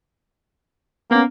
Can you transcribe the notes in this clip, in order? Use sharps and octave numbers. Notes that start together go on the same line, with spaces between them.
A#3 B3 C#4